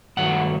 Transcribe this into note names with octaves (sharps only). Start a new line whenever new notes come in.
G2 D#3 F#3 A3 F#5